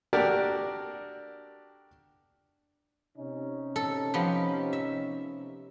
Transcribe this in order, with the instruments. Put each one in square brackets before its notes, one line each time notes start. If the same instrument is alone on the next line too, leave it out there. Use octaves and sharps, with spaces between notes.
[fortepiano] D4 F#4 G4 A4 A#4 D5
[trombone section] C3 C#4 D#4
[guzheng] A4
F3 B3 G4
E5